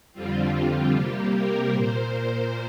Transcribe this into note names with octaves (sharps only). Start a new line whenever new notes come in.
F2 D3 G3 C4 F4
C3 G3 A#3 G4
A#4
A#2 A#3 C5
C5